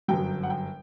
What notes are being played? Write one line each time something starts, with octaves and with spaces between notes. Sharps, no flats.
G1 F#2 F#3 G5
F#5
G5